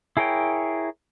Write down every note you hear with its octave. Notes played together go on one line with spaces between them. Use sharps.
E4 G#4 A#4 C#5 G5